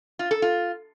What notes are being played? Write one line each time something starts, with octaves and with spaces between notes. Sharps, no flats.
F4
A4
F4